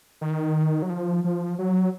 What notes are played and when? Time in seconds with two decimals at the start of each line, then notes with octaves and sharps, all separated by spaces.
0.21 D#3
0.82 F#3
0.90 F3
1.24 F3
1.59 F#3